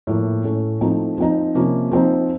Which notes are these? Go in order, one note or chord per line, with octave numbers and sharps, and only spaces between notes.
A2 F3 A#3
A2 A3 C#4
F3 A3 C4 D#4
F3 C4 D#4
C3 F3 A#3 C#4
F3 C4 D#4